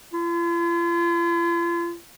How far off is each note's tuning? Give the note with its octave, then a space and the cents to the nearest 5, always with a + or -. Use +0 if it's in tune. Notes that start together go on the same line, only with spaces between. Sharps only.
F4 -45